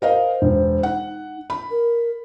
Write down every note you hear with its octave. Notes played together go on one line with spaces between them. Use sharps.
A#4 C5 D#5 F5
E1
D#4 F#5
B5
A#4